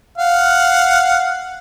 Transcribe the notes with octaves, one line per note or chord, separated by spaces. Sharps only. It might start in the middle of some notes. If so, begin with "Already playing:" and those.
F5 F#5